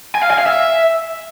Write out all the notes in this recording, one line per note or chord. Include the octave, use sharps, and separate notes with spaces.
G#5
F5
G#5
F5
E5